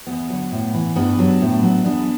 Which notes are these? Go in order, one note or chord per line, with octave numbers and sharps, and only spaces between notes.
E2 B3
D3 F#3
A2
E3
G2 B3 D4
F#3
A2
F#3
E2 B3 D4